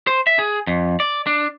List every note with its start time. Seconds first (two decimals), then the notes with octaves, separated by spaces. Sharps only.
0.07 C5
0.27 E5
0.39 G#4
0.67 F2
1.00 D5
1.27 D4